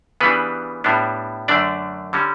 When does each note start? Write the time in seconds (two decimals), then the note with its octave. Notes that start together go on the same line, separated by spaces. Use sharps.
0.20 C#3 E3 G3 B3 D4 B4
0.84 A2 G3 B3 D4
1.48 F#2 D3 A3 D4 D5
2.13 D3 G3 C#4